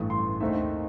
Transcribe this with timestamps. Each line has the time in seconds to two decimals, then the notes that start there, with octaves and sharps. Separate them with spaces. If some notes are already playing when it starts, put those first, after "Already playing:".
Already playing: A1 G2 E3 A3 D#6
0.10 C6
0.40 D#2 D#3 A3 C4 D#4 E5